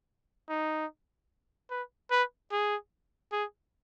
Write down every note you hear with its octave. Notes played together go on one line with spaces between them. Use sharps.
D#4
B4
B4
G#4
G#4